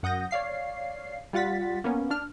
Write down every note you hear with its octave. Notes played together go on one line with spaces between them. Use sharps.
F#2 F#5 D#6 G6 A#6
C#5 D5 F5 C7
G3 F4 F#5 A6 B6
A#3 B3 C#4
D4 F6